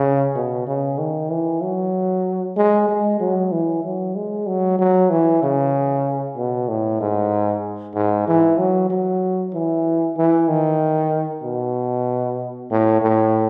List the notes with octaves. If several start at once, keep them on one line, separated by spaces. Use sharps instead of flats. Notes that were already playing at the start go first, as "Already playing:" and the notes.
Already playing: C#3
B2
C#3
D#3
E3
F#3
G#3
G#3
F#3
E3
F#3
G#3
F#3
F#3
E3
C#3
B2
A2
G#2
G#2
E3
F#3
F#3
E3
E3
D#3
B2
A2
A2